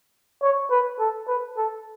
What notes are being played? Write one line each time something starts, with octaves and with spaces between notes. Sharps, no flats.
C#5
B4
A4
B4
A4